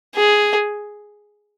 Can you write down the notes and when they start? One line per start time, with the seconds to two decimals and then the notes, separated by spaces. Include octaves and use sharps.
0.16 G#4